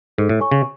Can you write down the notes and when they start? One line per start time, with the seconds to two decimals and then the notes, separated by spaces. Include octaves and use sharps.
0.18 G#2 A4
0.29 A2
0.40 C#5 G#5 C#6
0.51 C#3